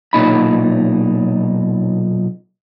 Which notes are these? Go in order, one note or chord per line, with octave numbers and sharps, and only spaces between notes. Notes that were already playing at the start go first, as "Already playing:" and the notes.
B1 A#2 D#4 B5